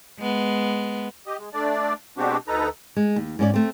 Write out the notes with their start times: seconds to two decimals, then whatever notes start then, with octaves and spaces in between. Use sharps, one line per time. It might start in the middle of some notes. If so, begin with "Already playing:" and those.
0.18 G#3 B3
1.27 G4 D#5
1.39 G#3
1.54 A3 D4 D5
2.18 B2 G#3 C4 D4 F#4 G4
2.48 D2 D#4 A4 B4 A#5
2.96 G#3
3.16 D#2
3.39 G#2 C#4 D5
3.54 A3 C4